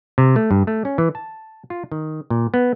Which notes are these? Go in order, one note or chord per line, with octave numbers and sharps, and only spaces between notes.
C3
A3
G2
A3
C#4
E3
A5
F4
D#3
A#2
B3